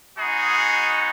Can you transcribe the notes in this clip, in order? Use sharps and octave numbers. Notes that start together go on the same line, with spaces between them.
G#3 B3 D#4 F#4 G#4